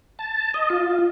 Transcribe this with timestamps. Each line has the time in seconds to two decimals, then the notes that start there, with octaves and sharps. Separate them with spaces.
0.19 A5
0.54 D#5
0.70 F4